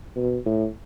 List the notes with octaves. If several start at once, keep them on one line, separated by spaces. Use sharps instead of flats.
B2
A2